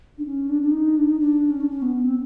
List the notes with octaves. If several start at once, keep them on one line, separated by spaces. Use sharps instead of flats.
D4
C#4
D4
D4
D#4
D4
D#4
D4
C#4
D4
C#4
B3
C4